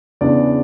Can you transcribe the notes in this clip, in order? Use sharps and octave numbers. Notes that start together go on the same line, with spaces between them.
E2 C#3 E3 B3 D4 D5